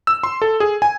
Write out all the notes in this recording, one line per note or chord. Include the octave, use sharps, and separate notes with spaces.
E6
C6
A4
G#4
G#5